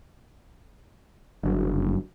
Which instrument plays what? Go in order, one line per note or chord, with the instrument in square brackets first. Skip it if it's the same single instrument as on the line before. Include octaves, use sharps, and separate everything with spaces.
[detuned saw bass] F#1 [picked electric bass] G2 D3 F#3